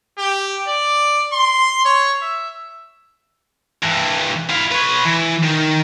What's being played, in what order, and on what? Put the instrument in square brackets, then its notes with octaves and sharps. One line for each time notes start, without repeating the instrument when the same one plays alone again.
[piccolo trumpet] G4
D5
C6
C#5
E5
[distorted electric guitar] G2 E3
E4 F5
B4 C#5
E3
D#3